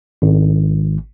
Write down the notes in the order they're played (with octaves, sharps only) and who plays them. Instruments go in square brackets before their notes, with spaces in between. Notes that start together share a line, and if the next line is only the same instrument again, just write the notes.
[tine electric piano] G#1